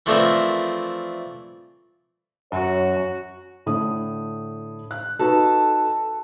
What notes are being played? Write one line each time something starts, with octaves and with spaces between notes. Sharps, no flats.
E3 F3 A3 C4 D4 A#4
F#2 F#4 C#5
A2 D3 D#6
F#6
D#4 F#4 A4 B4